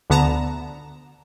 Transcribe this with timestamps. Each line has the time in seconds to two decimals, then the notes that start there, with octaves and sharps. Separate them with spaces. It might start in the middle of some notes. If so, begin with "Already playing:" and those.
0.10 D2 D3 B3 A5 A#5 E7